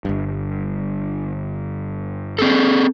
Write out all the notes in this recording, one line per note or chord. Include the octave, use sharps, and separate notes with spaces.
G1 G2
C4 G#4 A4